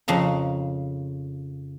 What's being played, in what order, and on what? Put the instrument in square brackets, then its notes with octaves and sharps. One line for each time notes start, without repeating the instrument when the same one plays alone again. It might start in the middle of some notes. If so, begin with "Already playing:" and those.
[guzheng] F2 C#3 A#5